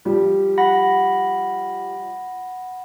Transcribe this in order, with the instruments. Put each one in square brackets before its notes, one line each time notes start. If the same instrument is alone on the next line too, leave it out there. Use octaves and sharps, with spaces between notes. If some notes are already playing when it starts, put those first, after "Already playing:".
[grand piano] F3 G3
[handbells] F#5 B5 A#6